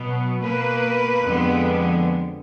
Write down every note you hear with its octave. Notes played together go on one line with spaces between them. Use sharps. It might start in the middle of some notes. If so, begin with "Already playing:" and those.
Already playing: B2 F#3 B3
B2 A#3 B4
F2 D3 F3 G#3 B3